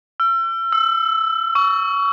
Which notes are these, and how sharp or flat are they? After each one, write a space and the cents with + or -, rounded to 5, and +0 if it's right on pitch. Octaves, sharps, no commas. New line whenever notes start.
E6 +40
E6 -5
C#6 +25